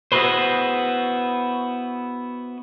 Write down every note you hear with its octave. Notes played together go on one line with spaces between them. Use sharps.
B3 E4 F#4 G#4 B4 C5